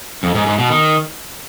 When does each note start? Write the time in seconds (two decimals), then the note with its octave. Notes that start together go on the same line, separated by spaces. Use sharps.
0.23 F2
0.35 G#2
0.46 G#2
0.58 B2
0.70 D#3